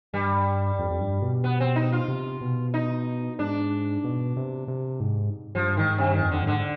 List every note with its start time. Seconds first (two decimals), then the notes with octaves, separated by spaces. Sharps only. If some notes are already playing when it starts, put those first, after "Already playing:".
0.13 G2 G3
0.79 F2
0.90 F2
1.00 G2
1.22 B2
1.44 B3
1.60 C4
1.76 D#4
1.92 F4
2.08 C3
2.41 B2
2.74 D#4
3.39 G#2 D4
4.04 B2
4.37 C3
4.68 C3
5.00 G#2
5.55 G2 F3
5.77 G#2 D#3
5.98 G2 C3
6.14 D#3
6.20 F2
6.31 D3
6.42 G#2 D3